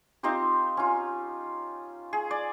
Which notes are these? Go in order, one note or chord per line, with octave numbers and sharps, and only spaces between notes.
C4 D#4 F4 G4
C#4 F4
G#4
D5